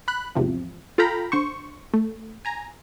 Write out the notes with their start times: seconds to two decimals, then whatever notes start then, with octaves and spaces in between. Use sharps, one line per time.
0.08 B5 F#6
0.35 G#1 E2 C3 F3
0.98 F4 A4 F5 G5 A#5 B5
1.32 D3 C5 C#6
1.94 A3
2.45 G#5 A#5